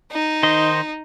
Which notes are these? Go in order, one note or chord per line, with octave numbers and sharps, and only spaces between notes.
D#4
D#3 C5 D#5